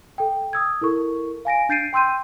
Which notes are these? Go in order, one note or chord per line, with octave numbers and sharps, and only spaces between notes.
A4 G5
D#6 E6 G#6
E4 A4 A#4 C#6
F5 G#5 A#6 D7
D4 G6 A6 C7 D7 D#7
G5 C6 E6 G6 D#7